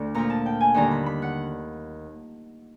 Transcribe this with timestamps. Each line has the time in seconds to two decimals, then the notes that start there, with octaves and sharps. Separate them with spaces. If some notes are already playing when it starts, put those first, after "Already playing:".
Already playing: D2
0.15 A#2 F3 A#5
0.30 A5
0.46 G5
0.60 G#5
0.74 D#2 D3 G3 A#5
0.91 B5
1.06 B5
1.22 F#5